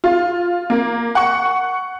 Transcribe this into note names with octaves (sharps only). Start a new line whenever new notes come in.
F4
A#3
F#5 C#6